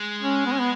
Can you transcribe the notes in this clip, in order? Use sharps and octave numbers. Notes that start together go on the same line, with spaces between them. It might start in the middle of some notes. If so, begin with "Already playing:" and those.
Already playing: G#3
C#4
B3
C#4
B3